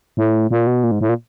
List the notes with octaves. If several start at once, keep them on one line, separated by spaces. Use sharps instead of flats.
A2
A#2
B2
A#2
G#2
A2
A#2